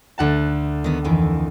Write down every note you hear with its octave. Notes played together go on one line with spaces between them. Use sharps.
D2 F#5 A5
D#3 B3
F2 D#3 E3